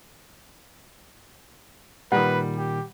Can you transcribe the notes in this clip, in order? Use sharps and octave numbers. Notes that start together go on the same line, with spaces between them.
A#2 D#3 G3 B4 F#5
G4